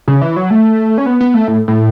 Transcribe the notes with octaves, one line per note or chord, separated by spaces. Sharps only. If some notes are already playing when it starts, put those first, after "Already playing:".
C#3
E3
F#3
A3
C#4
B3
B3
A3
A2
A2